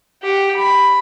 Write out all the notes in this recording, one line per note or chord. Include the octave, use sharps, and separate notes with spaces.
G4 F#5
B5